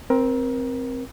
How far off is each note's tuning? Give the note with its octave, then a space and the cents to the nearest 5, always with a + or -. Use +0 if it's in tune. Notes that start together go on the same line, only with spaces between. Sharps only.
C4 +0 A#4 +25